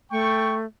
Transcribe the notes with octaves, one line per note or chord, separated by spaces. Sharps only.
A3 G5 C#6